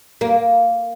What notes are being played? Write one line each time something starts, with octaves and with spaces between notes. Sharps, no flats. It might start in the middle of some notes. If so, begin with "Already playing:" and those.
A#3